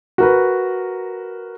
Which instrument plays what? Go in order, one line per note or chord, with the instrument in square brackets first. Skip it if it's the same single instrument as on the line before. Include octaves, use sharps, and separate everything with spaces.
[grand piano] F#4 A#4 B4